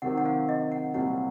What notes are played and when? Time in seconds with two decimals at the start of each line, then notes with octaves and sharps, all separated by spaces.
0.02 C3 D#3 F#3 C4 F#5
0.18 F#5
0.26 F5
0.49 D#5
0.72 F#5
0.94 C2 A#2 F#3 C4 F#5